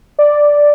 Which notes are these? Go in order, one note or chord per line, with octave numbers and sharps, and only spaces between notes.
D5